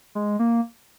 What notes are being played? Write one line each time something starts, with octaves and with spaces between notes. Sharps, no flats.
G#3
A#3